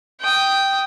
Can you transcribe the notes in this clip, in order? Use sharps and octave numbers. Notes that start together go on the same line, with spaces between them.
G5 D#6